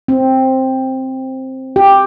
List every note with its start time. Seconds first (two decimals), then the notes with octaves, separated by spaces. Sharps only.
0.08 C4
1.76 G4